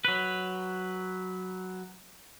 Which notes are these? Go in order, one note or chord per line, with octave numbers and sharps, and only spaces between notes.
F#3 B4